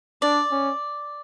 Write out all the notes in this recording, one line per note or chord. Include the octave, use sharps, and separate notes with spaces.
D4 D5
C#4